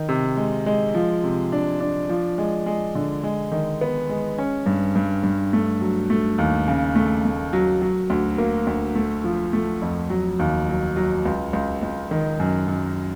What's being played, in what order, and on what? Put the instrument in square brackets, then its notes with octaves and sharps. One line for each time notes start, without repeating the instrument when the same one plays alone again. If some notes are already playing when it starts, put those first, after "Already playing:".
Already playing: [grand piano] D#3
C3
G#3
G#3
F3
C3
D4
D4
F3
G#3
G#3
D3
G#3
D#3
B3
G#3
C#4
G2
G2
G2
A3
F#3
A3
D#2
C#3
A3
A3
F#3
F#3
D2
A#3
D2
A3
F3
A3
F2
F#3
D#2
F#3
F#3
C#2
C#2
C#2
D#3
F#2
F#2